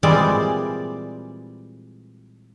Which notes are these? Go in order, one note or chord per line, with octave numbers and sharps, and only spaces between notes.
A#2 E3 G3 G#3 C4 D5